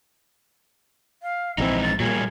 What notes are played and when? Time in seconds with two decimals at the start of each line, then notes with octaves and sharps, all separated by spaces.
1.23 F5
1.58 A#1 E3 F3 G#3 C4 D#4 E4
1.83 A6
2.00 A#2 F#3 G3 A#3 G#4